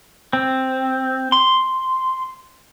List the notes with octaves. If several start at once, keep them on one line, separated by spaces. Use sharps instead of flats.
C4
C6